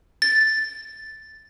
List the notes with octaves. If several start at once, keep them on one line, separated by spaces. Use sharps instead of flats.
A6